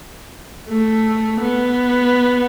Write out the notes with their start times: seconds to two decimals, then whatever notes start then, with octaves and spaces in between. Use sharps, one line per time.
0.69 A3
1.41 B3